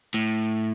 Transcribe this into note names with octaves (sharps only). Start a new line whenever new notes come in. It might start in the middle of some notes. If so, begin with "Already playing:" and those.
A2